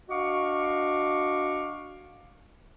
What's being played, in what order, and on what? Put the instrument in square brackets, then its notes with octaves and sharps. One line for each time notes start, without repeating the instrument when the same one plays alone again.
[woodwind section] D4 F#4 D#5 F5 C#6 D6